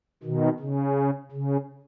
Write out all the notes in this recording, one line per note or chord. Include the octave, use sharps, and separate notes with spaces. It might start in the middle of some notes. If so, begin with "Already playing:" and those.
B2 D#3
C#3
C#3